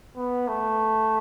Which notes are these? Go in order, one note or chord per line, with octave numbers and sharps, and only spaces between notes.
B3
A3